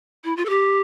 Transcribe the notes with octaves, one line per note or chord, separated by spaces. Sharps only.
E4
F4
A4
G4